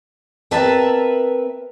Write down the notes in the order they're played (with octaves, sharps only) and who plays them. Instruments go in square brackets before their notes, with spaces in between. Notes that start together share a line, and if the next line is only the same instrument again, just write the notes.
[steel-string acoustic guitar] C4 A#4 B4 E5 A5 A#5